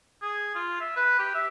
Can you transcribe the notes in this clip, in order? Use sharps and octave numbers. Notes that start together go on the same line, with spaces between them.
G#4
F4
E5
B4
G4
E5